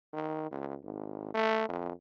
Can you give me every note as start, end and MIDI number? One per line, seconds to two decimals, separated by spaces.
0.13 0.48 51
0.51 0.75 37
0.84 1.32 32
1.34 1.66 57
1.69 1.92 41